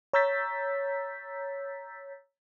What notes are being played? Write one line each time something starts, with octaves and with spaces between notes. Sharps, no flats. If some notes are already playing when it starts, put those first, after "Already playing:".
C#5 A#5 E6 G6 A6 B6